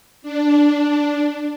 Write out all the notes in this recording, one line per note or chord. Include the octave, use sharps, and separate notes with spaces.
D4